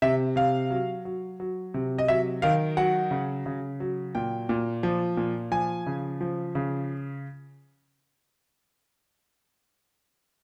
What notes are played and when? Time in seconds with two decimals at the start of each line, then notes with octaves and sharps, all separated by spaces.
0.02 C3 E5
0.36 C3 F5
0.70 F#3
1.05 F#3
1.40 F#3
1.74 C3
1.98 D#5
2.08 F#3 E5
2.42 D#3 F5
2.77 F#3 F#5
3.11 C#3
3.46 C#3
3.80 F#3
4.15 A#2 G5
4.49 A#2
4.83 F3
5.17 A#2
5.51 F3 G#5
5.87 C#3
6.21 F3
6.55 C#3